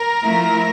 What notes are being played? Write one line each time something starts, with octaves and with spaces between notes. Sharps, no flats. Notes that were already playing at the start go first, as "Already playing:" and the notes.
Already playing: A#4
F3 A3 E4